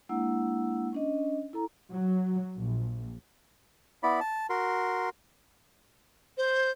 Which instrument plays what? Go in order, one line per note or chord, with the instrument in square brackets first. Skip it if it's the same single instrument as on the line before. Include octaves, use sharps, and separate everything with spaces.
[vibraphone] G#3 A#3 D4 E4 F#5 E6
C#4 D4 D#5
E4 A4 A#5
[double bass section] F#3
A#1
[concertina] B3 E4 D5 B5
A5
F#4 A#4 C6
[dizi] C5